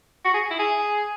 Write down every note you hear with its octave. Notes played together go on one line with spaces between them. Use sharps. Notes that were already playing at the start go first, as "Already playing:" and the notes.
F#4
G#4
E4
G#4